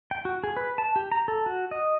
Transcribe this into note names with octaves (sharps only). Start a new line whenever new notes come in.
G5
F#4
G#4
B4
A5
G4
A#5
A4
F#4
D#5